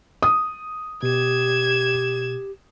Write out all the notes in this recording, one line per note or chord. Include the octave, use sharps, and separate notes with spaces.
D#6
B2 G4 G#6 E7